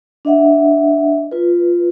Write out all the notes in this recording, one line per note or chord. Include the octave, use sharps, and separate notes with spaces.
D4 D#5 E5 F#5
F4 B4